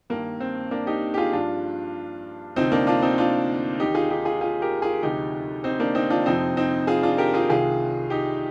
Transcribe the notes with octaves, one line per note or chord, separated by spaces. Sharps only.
G2 D#3 A#3
C4
A#3 D4
D#4 G4
G4
F4 G#4
G2 F3 D4 F4
D2 C3 F3 C4 D#4
A#3 D4
D4 F4
C4 D#4
D4 F4
D#2 D#3 D#4 G4
F4 G#4
D#4 G4
F4 G#4
F4 G#4
G4 A#4
F4 G#4
D2 C3 F3 D#4 G4
C4 D#4
A#3 D4
C4 D#4
D4 F4
F2 C3 F3 C4 D#4
C4 D#4
F4 G#4
D4 F4
G4 A#4
F4 G#4
C2 C3 D#3 F4 G#4
D#4 G4